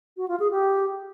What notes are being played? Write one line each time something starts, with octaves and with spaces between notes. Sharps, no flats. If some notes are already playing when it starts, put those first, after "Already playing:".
F#4
F4
G#4
G4